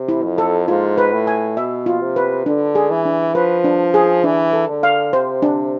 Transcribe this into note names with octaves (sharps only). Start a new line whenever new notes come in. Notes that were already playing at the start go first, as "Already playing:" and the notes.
Already playing: C3
E4
F2
A4
G#2 F4
B4
A2
G#5
B2 E5
F4
C3
B4
D3 D4
G#4
E3
D4
F3 B4
D4
G#4
E3 D4
A4
D3
F5
C3 C5
D4